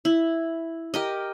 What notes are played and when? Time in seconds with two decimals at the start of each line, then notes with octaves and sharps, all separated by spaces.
0.05 E4
0.94 G4 A#4 D#5